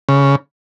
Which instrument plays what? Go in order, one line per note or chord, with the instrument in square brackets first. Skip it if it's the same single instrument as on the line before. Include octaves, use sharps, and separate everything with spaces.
[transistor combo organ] C#3